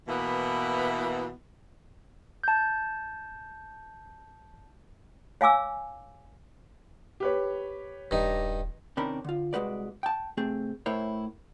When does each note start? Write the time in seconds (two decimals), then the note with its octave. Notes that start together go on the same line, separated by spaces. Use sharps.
0.09 B2 E3 A#3 B3 E4
2.44 A5 G6
5.41 C#5 F5 G#5 D6 E6
7.20 G4 B4 C#5
8.11 D#1 G2 D#4
8.97 C3 D#3 C#4 D4 A#4 B5
9.24 D3 F4
9.53 C2 G#3 F#4 B4 D5
10.03 G5 A5
10.37 C3 A3 C4 G#4
10.86 A2 E4 A#4 C5 C#5